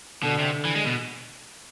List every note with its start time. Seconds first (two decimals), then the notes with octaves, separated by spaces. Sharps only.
0.23 B2 D3
0.39 C3
0.55 D3
0.65 E3
0.75 G#3
0.86 B2